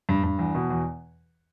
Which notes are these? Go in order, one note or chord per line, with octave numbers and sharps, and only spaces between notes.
G2
G2
E2
B2
E2